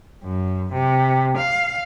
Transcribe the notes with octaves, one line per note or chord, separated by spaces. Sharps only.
F#2
C3
F5